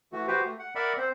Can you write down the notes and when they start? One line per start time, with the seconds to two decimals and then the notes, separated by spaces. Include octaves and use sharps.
0.13 E3 A3 F#4
0.28 F#4 G4 B4 C5
0.45 A3
0.59 F#5
0.75 A#4 D5 E5 F#5 B5
0.98 C4 C5